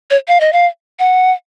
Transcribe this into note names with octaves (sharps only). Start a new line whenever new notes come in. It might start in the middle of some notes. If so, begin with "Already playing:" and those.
C#5
F5
D#5
F5
F#5